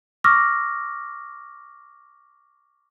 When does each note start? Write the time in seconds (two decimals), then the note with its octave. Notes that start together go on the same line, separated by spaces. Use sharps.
0.24 C#6 D6 E6 F6 A#6